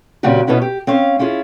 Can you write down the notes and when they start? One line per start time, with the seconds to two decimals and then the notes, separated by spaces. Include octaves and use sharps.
0.23 A#2 C#3 F#3 C4 F#4 G4
0.47 B2 B3 C#4 E4 F#4
0.62 G4
0.87 C4 C#4 F5
1.19 C#4 E4 F4 G#4